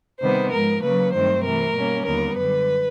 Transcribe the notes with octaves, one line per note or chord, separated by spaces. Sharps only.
C3 D#3 G3 B3 C5
G#2 F3 G#3 A#4
C#3 F#3 A#3 B4
G2 D#3 F#3 A3 C4 C5
C3 E3 A3 A#4
B2 G3 A#3 C#4
D#2 D3 G3 B3 A#4
F#2 D3 G3 B4